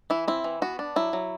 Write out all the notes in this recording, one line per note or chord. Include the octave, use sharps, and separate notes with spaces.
E3 E4
C4 E4
E3
B3 F#4
D4
F#3 E4
F#3